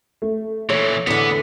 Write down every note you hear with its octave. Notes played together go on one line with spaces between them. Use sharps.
A3
A#2 E3 C#5
E2 D3 B3